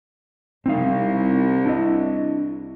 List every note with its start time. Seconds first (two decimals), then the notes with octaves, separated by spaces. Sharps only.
0.66 C2 C4 D#4 F5
1.65 D4 E4 D#5